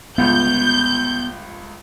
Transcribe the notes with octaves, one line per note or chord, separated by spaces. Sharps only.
G1 C#2 B3 F4 G6